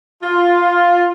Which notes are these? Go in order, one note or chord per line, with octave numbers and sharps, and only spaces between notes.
F4